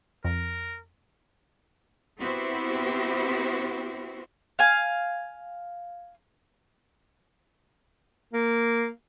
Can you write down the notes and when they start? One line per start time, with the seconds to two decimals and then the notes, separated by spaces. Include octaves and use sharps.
0.24 F2 A#4
2.20 B3 C4 E4 F#4 G4 C5
4.59 F5 G#5
8.33 A#3